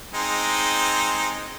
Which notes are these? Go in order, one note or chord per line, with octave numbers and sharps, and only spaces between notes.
G#3 C4 D#4